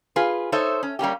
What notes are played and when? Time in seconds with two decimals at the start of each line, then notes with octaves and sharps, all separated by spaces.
0.16 F4 G#4 B4
0.52 D#4 A4 C5 C#5 E5
0.83 C#4
0.99 G3 A#3 C#4 G4